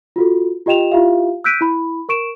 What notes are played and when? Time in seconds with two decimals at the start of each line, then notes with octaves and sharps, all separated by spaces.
0.16 F4 F#4 A4
0.66 F4 G4 D#5 G5 E7 F7
0.92 E4 F4 G4 E5 F5
1.44 E6 F#6 G6 B6 D7 D#7
1.61 E4 B5
2.09 A#4 C#6 D7 E7